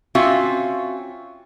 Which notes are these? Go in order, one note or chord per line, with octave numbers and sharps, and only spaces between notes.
C4 C#4 F4 F#4 E5